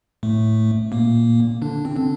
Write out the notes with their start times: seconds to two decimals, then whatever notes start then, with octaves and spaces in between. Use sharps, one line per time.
0.23 A2 A3
0.92 A#2 A#3
1.62 D3 D4
1.85 C4
1.96 D3 D4